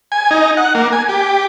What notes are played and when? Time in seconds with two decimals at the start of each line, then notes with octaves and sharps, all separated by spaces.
0.12 G#5
0.31 D#4
0.57 F#5
0.75 A#3
0.93 G#5
1.09 G4